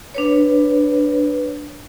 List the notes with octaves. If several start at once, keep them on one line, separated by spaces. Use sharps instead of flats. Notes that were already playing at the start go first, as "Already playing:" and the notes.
D4 B4 C#5